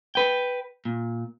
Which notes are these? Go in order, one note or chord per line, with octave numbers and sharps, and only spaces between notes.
B4 G5
A#2